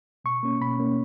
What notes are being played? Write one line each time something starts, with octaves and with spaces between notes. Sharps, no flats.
B2 C#6
A#3 C#4
B2 B5
A#3 C#4